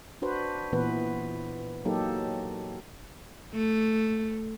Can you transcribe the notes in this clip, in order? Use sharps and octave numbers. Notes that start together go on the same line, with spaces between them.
D4 F#4 B4 C5
A#2 E3 B3 B4
F#3 A#3 D#4 G4 A4
A3